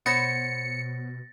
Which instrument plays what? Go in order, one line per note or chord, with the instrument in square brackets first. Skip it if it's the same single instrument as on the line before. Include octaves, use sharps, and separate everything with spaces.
[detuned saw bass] B2 [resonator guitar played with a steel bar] B3 C5 C#5 [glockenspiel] A6 A#6 [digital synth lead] C#7